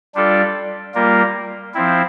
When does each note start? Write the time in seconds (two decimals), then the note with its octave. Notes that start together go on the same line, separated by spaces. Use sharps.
0.15 G3 D4 F4 A4 D5
0.94 G3 A#3 F4 A#4
1.74 F3 C4 E4